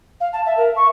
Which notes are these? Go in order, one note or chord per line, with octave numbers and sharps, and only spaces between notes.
F5
A5
E5
A#4
C#6